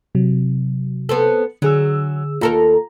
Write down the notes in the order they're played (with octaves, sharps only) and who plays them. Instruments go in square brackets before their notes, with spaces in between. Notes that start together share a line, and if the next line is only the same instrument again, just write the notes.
[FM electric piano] C3 F#3
[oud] B3 C4 A4
[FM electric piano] D3 G#4 E6 [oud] F#3
[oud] D#2 A4 A#4 [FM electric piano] F4 A#5